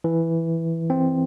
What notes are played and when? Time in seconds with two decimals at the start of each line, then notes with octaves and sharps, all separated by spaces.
0.04 E3
0.90 C4